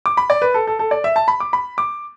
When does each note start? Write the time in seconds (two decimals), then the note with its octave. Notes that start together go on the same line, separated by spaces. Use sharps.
0.06 D6
0.17 B5
0.30 D5
0.42 B4
0.54 A4
0.67 A4
0.79 A4
0.91 D5
1.04 E5
1.16 A5
1.28 B5
1.40 D6
1.53 B5
1.78 D6